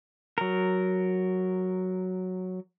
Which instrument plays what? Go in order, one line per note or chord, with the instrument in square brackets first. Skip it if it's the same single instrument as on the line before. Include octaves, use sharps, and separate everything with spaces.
[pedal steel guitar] F#3 A#4